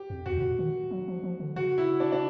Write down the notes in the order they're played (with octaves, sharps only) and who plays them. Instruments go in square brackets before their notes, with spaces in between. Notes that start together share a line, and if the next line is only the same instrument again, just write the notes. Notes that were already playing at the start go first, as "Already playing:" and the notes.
Already playing: [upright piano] G4
[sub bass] F2
[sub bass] E2 [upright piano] F#4
[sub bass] A2
A#2
D#3
F#3
F3
F3
D3
[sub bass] C#3 [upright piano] F#4
[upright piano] E4
D4
D4